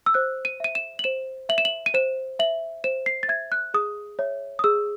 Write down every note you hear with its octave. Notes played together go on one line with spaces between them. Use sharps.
E6
C5 F#6
D#7
E5 D#7
E7
F#7
C5 E7
E5 F#7
E7
F#7
D#7
C5 E7
E5 F#7
C5 E7
C7
A6
E5 G#6
F#6
G#4 D#6
C#5 E5
D#6
G#4 E6